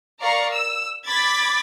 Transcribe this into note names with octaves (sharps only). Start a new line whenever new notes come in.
A#4 D5 F5 A#5 C#6 C7
E6
B5 D6 G#6 A6 B6